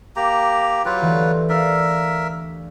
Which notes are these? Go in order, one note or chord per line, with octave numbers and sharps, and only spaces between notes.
A#3 G4 A#5
F#3 F4 G4 B4
D2 E3
D4 A#4 E5 F5